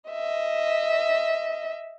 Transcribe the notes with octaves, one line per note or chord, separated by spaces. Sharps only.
D#5 E5